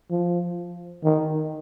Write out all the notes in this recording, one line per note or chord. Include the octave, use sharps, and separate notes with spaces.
F3
D#3